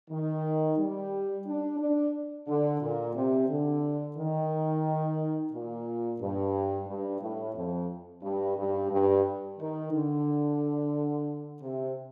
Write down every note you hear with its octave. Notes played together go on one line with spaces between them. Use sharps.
D#3
G3
D4
D4
D3
A#2
C3
D3
D#3
A#2
G2
G2
A2
F2
G2
G2
G2
D#3
D3
C3